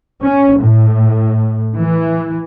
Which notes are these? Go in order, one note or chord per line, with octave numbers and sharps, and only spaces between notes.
C#4
A2
E3